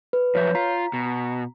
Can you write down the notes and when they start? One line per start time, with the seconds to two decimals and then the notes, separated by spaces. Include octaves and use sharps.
0.13 B4
0.35 F#2 F3 C#5 E5 G6
0.55 F4 A#5 B6
0.93 B2